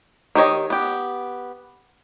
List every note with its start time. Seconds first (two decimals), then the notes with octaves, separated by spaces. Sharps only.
0.35 D#3 G4 C#5 D#5
0.70 B3 G4